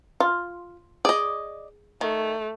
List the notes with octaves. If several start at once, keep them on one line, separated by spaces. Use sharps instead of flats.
F4
G#4 D5 D#5
D#3 A3